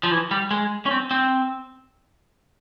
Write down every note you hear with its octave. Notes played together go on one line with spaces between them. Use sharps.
F3
E3
G3
G#3
C#4
C4
C4